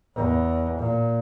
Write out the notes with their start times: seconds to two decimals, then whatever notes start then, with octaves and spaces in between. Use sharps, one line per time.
0.16 E2
0.79 A#2